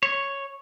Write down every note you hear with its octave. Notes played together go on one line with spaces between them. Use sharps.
C#5